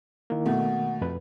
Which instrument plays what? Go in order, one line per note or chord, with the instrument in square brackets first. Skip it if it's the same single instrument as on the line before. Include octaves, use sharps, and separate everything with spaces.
[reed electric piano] D#3 A#3 [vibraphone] E4
[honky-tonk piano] B2 A3 [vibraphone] F#5
[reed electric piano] F2 B4